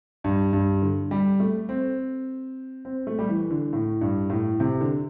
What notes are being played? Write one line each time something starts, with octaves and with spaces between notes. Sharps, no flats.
G2
G2
D3
G3
A3
C4
C4
A3
G3
E3
D3
A2
G2
A2
C3
D3